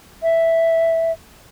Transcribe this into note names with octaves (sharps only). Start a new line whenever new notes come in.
E5